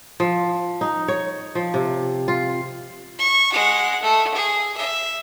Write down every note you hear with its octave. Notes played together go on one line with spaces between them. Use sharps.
F3
D#4
C#5
F3
C3
F4
C#6
G#3 F#5
A3
G#4
E5